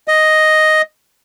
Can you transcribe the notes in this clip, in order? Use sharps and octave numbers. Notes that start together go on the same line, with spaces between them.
D#5